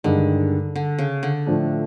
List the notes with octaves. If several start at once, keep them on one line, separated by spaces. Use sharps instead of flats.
G2 D3 D#3 G#3
D3
C#3
D3
A2 F3 A3 D4